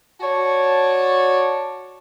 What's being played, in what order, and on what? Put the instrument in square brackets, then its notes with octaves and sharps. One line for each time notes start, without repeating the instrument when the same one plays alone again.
[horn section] F#4 C#5 D5 A5